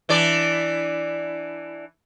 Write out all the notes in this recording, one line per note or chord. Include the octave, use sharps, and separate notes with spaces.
E3 D4 D5